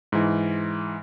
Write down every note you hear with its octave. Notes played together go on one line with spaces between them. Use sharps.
G#2 E3